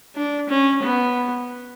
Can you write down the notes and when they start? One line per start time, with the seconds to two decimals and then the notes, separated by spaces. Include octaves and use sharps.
0.15 D4
0.49 C#4
0.82 B3